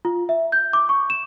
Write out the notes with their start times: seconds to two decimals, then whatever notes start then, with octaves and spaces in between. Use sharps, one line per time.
0.05 F4
0.29 E5
0.52 G6
0.73 D6
0.89 C#6
1.10 E7